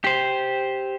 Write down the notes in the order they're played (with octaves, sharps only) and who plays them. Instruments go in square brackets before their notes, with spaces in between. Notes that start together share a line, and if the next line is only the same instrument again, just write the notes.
[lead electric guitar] G4 C5